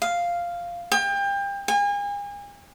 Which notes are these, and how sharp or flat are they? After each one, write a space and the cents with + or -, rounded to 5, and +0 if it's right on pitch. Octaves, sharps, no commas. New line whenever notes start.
F5 -5
G5 +30
G#5 -40